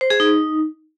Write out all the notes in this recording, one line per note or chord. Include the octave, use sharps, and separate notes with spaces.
C5
G#4
D#4